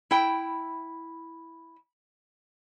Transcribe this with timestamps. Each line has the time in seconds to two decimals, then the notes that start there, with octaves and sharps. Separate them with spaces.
0.11 E4 G5